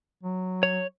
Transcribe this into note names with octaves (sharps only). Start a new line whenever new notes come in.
F#3
C#5